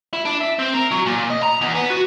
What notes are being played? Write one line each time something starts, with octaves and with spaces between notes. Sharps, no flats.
E4
D4
E5
C4
A#4
F#3
A#2
D#5
A#5
E2
B3
F#4